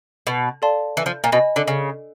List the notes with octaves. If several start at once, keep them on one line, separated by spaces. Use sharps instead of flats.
B2
A4 D5 F5 A5 C6
E3
F3
A#2
B2 D#5 G#5 B5
D3
C#3